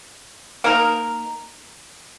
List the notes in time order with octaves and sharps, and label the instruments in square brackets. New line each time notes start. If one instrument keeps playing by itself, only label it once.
[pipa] A#3 D#4 A#4